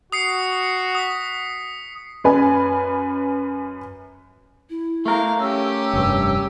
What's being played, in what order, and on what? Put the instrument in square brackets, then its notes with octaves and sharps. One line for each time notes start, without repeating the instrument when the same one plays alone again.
[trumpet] F#4 [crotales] D#6 C7 C#7
[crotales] D#6 B6
[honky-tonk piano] F#2 B4 G#5
[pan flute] E4
[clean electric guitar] A3 A#4 [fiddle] F5
[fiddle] C#4 G4 [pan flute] E6
[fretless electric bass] F1 G2